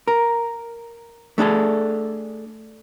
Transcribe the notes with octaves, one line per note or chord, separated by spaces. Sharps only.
A#4
A3 D4 G#4 A4